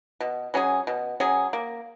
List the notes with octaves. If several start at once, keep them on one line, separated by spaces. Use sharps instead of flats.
B2
F#3 C#4 G#4
B2
F#3 C#4 G#4
A#3